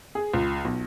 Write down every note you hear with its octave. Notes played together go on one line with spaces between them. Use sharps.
G#4
C#2
B1